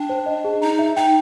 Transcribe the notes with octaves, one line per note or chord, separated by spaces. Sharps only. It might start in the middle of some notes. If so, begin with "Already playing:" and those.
Already playing: D4 G5
C5
D#5
G#4
D#4 A#5
E5
D#4 G5